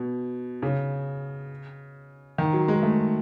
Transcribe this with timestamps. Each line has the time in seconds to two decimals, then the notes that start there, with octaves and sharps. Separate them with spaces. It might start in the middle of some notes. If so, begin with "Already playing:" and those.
Already playing: B2
0.62 C#3
2.38 D#3
2.53 F#3
2.68 G#3
2.83 A3